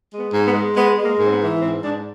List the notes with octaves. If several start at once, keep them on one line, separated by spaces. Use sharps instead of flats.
G#3
B3
G#2
B3
G#3
G#3 B3
G#3
A#3
G#2
C4
B3
E3
G#2 C4
G#2 D4